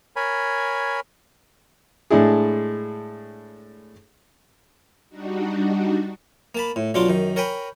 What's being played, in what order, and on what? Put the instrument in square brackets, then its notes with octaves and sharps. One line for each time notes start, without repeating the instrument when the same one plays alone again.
[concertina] A#4 C#5 G#5 B5
[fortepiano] A2 G#3 D4 E4 G#4
[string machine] G3 D4 D#4 F#4
[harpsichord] A#3 A5 B5
A2
B1 F#3 D4 F4 D6
F#2 D#3
A#4 C#5 G5 G#5 B5